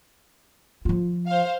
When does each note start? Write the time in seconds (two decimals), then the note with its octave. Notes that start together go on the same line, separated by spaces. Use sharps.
0.85 F3 F4
1.26 C5 F5